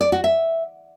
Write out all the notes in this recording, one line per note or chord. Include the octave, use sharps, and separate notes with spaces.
D5
F#4
E5